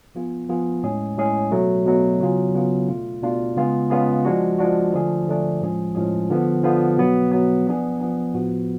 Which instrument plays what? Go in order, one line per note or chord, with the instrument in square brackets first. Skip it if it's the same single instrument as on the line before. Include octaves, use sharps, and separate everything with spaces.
[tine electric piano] F3 B3 F4 G#4
F3 B3 F4 G#4
A2 G#3 C#4 G#4
A2 G#3 C#4 G#4
B2 F#3 A3
B2 F#3 A3
C#3 F#3 B3 F4 G#4
C#3 F#3 B3 F4 G#4
B2 A3 D4 F4
B2 A3 D4 F4
C#3 G#3 B3 F4 G#4
C#3 G#3 B3 F4 G#4
F3 G#3 D4 F#4
F3 G#3 D4 F#4
D3 F3 A3 D4 G#4
D3 F3 A3 D4 G#4
A2 F3 G#3 C#4 G#4
A2 F3 G#3 C#4 G#4
D3 F3 B3
D3 F3 B3
B2 F#3 B3
B2 F#3 B3
F3 B3 D4 G#4
F3 B3 D4 G#4
A2 F3 B3 F#4